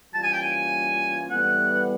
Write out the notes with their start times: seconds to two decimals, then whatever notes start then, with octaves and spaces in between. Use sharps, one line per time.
0.14 E3 G3 A#3 C#4 F4 A5
0.23 G#5
0.32 G5
0.41 G#5
1.30 A2 E3 G3 B3 F#5